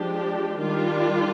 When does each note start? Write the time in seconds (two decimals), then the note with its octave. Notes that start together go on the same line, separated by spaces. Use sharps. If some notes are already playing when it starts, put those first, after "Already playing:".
Already playing: F3 G#3 D4 G4
0.60 D#3 G3 D4 F4